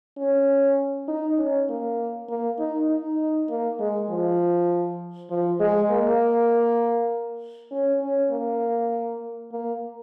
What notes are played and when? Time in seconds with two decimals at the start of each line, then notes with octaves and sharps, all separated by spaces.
0.18 C#4
1.08 D#4
1.38 C#4
1.69 A#3
2.29 A#3
2.59 D#4
2.90 D#4
3.50 A#3
3.80 G#3
4.10 F3
5.30 F3
5.60 G#3
5.91 A#3
7.71 C#4
8.02 C#4
8.31 A#3
9.52 A#3